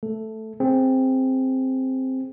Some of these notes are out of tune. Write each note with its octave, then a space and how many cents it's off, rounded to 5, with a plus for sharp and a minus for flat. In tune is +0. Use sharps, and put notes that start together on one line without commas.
A3 +0 A4 +0
C4 +0 G#4 +0